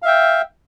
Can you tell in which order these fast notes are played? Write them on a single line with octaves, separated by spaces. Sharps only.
F5 E5 G5